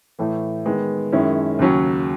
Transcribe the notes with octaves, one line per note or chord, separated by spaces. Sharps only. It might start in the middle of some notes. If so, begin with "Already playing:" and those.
A2 E3 A3
D#3 G#3 B3
F#2 D#3 G#3 C#4 E4
D#2 C#3 F#3 C#4